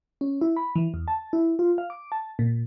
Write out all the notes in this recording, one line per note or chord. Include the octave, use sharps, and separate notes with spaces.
C#4
E4
B5
E3
E2
A5
E4
F4
F5
D6
A5
A#2